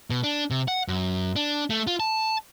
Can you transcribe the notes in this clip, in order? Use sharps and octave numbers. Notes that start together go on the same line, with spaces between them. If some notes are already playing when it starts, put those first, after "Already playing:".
B2
D4
C3
F#5
F#2
D4
A3
F4
A5